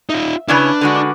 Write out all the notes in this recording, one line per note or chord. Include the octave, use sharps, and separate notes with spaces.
D#4 F4 E5
C#3 C#4 D4 E4 B4 D5 F5
D3 G#3 F#4
D6